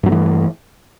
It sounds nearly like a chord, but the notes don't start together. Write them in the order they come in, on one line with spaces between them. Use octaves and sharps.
G2 F#3 A3 E3